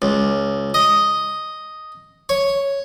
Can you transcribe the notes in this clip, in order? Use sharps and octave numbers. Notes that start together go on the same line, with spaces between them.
C#2
D#5
C#5